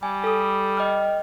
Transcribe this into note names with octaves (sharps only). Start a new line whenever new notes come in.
G3 G#5
A4 D#6
D#5 G5 F6